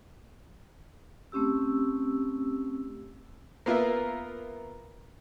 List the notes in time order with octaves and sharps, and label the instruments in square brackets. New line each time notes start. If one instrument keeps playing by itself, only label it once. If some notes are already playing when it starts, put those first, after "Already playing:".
[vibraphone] A3 C4 C#4 G4 E6
[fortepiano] A#3 B3 F4 A#4 B4 E5